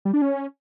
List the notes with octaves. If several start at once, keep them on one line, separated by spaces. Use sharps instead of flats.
G3
D4
C#4